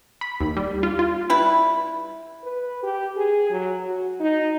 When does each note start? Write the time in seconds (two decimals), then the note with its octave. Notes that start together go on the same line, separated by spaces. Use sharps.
0.21 B5
0.40 D#2
0.57 G3
0.83 F4
0.99 F4
1.30 G3 E4 B4
2.44 B4
2.83 G4
3.16 G#4
3.50 F#3
3.86 F#4
4.20 D#4